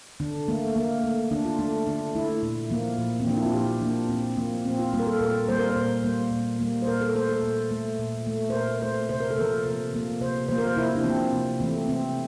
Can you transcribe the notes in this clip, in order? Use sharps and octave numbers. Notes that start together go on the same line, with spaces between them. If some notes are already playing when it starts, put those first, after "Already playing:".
D3 D4
A3 A#3
D3 A#3
A3
D3 D4
F4
A3 D4
D3 D4
A3 E4
A#2
F3 A#3
A#2
C4
F3 A#3 D4
E4
F4
A#2 G4
F3 A#3 D4
A#2 C4
F3 A#3
A#2 C4
F4
G3 A#3 F4
A#4
A4
A#2 A#4
G3 A#3 C5
A#4
C5
A#2
G3 A#3
A#2
G3 A#3
C5
A#2 A#4
A4
A3 C5
A4
A#2
A3
A#2
A3
C5
A#2 A#4
A3 C5
C3 C5
A#4
A4
F3 A#3 A#4
C3
F3 A#3
C3 C5
F3 A#3 C5
A#4
C5
C3 E4
D4
F3 A#3 C4
C3
E3 A3 C4
C3 C4